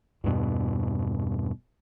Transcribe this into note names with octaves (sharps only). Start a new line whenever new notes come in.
E2 G2 B2